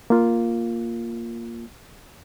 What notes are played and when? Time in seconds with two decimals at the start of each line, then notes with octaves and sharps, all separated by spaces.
0.10 A#3 F4